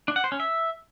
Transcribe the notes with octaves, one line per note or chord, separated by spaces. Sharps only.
D4
F#5
C5
C#4
E5